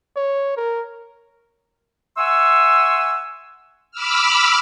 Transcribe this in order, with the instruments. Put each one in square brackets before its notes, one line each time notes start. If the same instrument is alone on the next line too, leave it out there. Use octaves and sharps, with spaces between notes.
[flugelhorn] C#5
A#4
[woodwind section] E5 F#5 G#5 C6 C#6 E6
[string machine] B5 D6 E6 F6